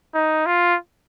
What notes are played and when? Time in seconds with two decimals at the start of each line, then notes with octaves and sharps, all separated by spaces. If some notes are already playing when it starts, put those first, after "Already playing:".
0.14 D#4
0.46 F4